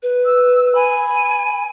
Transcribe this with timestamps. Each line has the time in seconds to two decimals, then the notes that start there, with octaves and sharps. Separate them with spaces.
0.03 B4
0.25 E6
0.75 G#5 B5